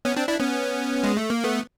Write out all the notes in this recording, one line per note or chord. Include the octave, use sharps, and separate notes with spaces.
B3 C#4
C4 D4
D4 E4
B3 C#4
G#3
A3
A#3
A3 B3